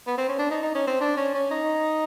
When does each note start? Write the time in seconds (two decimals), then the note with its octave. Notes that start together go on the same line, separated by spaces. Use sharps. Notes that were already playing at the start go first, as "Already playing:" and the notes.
0.07 B3
0.18 C4
0.29 C#4
0.39 D4
0.50 D#4
0.63 D#4
0.75 C#4
0.87 C4
1.01 D4
1.17 C#4
1.34 C#4
1.51 D#4